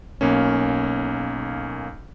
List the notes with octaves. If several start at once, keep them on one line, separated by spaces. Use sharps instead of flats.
B1 A#3 C#4